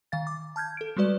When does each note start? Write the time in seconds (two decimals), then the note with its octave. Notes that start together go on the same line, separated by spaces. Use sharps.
0.12 D#3 F5 A6
0.27 D6
0.56 A5 F6 G6 G#6
0.77 A4 D7
0.97 G3 G#3 F#4 B4 D5